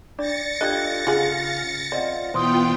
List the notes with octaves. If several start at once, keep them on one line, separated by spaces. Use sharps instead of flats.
D4 D5 A6 A#6 C#7
D4 F4 G4 A4 D#5 F#6 G#6
C#3 F4 G#4 F5 F#5
C4 F4 D5 D#5 F#5
B2 E3 B3 F4 C5 G5 C6 D#6